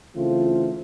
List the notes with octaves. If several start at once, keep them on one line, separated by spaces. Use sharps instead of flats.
C#3 E3 A3 C4 F4